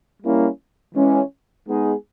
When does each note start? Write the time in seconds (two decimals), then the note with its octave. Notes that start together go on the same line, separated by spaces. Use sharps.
0.22 G3 A#3 C#4 E4
0.95 E3 G#3 C#4
1.68 G#3 B3 D#4 G#4